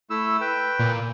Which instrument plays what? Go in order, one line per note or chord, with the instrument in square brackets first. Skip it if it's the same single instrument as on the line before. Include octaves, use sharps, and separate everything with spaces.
[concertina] A3 E4 E6
B4 G5
[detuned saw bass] A#2